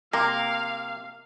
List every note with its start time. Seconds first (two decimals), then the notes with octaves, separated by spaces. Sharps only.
0.13 C3 A#3 A#4 F5